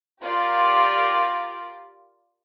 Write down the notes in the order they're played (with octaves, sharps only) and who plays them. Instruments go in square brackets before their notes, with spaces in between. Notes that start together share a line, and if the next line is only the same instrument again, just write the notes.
[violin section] F4 G4 A#4 D5